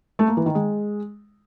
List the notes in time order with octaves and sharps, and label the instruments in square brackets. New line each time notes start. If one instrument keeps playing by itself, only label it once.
[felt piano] A3
A#3
E3
D#3
G#3